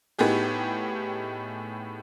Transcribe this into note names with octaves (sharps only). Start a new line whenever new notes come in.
A2 B3 D#4 G4 G#4